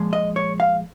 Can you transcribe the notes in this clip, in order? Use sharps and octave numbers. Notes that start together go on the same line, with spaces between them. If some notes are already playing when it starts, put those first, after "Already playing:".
Already playing: A#2 F3 G#3
D#5
C#5
F5